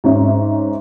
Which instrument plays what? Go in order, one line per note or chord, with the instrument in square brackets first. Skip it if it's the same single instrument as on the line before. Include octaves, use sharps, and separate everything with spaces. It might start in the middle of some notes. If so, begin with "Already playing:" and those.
[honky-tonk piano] G#2 C#4 E5